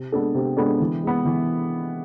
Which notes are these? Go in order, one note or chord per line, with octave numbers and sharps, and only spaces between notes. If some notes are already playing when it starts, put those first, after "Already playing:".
Already playing: C3
G#3 B3 D4 A4
C3
G#3 B3 D4 A4
E3
G#3 B3
E3